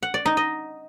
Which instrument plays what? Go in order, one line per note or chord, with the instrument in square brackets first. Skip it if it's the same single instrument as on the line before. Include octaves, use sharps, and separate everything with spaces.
[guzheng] F#5
D5
D#4
D#5